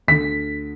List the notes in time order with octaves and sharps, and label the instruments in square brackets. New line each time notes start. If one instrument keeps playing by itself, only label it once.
[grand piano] D2 D3 B6